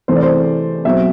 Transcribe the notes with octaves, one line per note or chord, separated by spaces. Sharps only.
C3 E3 A3 C5
D5
C5
B2 F#3 C4 E5